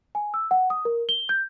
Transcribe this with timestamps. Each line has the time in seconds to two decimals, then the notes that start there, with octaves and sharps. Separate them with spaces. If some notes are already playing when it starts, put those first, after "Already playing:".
0.15 G#5
0.34 E6
0.51 F#5
0.70 D#6
0.85 A#4
1.09 G7
1.29 G6